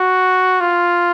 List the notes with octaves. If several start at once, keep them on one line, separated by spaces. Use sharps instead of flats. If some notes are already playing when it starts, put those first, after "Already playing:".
Already playing: F#4
F4